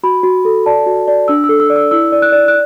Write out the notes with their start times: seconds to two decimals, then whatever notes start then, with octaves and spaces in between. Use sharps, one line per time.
0.03 F#4 B5
0.23 F#4
0.45 A4
0.66 D5 A5
0.86 F#4
1.08 D5
1.28 D4 E6
1.44 E6
1.49 A4
1.60 E6
1.70 D5
1.76 E6
1.91 E4 E6
2.12 D5
2.22 F#6
2.32 D5
2.48 F#6